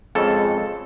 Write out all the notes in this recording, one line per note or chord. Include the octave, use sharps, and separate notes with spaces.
F2 C#3 G#3 A4